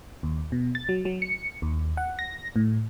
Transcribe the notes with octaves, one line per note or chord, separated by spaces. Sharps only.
D#2
B2
A6
F#3
F#3
C#7
D#2
F#5
A#6
A2